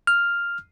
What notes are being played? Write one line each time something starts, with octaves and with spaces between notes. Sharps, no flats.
F6